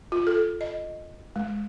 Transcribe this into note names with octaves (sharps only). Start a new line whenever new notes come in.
F4
A4
D#5
G#3